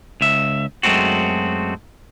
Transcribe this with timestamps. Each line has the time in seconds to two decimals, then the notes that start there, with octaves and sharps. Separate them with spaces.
0.21 C#2 E5
0.83 F#2 G#3 A3 C4 F#4